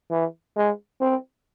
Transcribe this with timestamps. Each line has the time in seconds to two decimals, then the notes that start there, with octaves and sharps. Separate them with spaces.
0.11 E3
0.56 G#3
1.01 C4